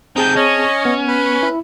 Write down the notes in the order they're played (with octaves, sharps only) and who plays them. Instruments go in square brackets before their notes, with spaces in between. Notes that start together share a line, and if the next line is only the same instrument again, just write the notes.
[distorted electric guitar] C3 D#4 [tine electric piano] C4 G#4 A5 [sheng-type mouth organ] G5 G6
[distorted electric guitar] C#4 [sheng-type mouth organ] C#5 D#5
[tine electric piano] B3
[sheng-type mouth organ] B4
[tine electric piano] E4